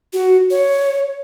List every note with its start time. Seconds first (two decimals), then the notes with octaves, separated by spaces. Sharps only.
0.13 F#4
0.51 C#5